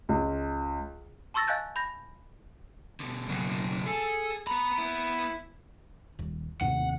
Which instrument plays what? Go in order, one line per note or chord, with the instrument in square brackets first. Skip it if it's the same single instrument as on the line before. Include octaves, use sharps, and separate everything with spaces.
[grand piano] C#2
[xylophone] A5 C6 C#6 E6 A6 A#6
D#5 F5 G#5 F#6 G6 A6
B5 G6 A#6
[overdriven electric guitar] B2 D3
[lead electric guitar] C#3 F#3
[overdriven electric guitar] G#4 [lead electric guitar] A4
[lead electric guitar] B3 B5 [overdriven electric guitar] A#5
[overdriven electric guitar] E4
[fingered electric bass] D#1
[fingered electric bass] D#2 A2 C3 [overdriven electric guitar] F#5